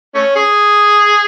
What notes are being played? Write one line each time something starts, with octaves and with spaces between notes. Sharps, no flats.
A3 C#4
G#4